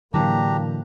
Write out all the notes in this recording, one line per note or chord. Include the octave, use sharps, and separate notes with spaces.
A2 D3 E3 F#3 A#3 D4 G4 A#5